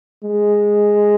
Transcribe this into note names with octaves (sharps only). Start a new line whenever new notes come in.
G#3